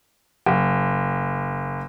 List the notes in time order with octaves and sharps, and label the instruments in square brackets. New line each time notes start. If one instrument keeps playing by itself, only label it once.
[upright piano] F#1